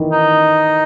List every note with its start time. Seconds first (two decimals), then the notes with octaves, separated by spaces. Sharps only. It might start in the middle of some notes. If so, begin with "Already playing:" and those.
Already playing: D#3 E3
0.12 D#4